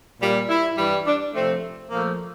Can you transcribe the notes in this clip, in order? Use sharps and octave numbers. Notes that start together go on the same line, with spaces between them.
A#2 G3
E4
G2 E3 G3
D4
C3 F3 A3 C4
A#2 F3 A3 A#3